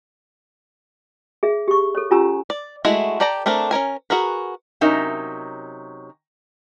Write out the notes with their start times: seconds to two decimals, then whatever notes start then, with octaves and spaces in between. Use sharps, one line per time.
1.43 G#4 E5
1.68 G4 C#6
1.95 A4 C#5
2.11 C#4 F4 G4 G#5 A#5 E6
2.50 D5
2.85 G#3 A3 E4 F#4
3.20 G4 A4 D5 A5 A#5
3.46 A3 C4 D4 A4 A#4
3.71 C#4 D#4 A#4 G#5
4.10 F#4 G#4 A#4 B4
4.81 C3 F#3 C#4 D#4 A#4 E5